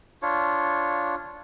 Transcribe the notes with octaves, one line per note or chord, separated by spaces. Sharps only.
D4 F4 C#5